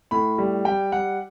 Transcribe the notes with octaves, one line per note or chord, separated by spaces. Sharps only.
A2 B5
G3
G3 G5
G3 F#5